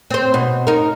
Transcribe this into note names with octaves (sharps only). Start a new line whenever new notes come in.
C4 C5
B2
D#4 A#4